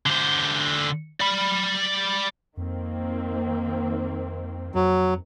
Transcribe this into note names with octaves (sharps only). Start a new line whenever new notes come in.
D3 C5
D5 B5
F2 D#3 A#3 C4
F2 F#3